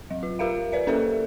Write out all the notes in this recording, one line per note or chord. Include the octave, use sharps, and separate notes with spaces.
F#3
F4
F4 G4 A#4 E5 F5
B4 D5 E5
A#3 C#4 A4 A#4 C5 E5